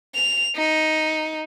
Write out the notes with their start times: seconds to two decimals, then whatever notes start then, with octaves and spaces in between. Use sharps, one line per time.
0.15 F7
0.56 D#4